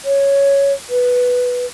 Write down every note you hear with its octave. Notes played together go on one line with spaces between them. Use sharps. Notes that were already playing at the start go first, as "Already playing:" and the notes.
C#5
B4